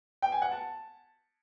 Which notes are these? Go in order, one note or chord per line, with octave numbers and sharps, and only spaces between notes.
G5
G#5
F#5
A5